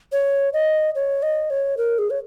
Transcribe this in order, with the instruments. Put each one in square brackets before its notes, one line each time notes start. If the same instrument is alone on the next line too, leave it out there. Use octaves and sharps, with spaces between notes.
[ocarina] C#5
D#5
C#5
D#5
C#5
A#4
G#4
C#5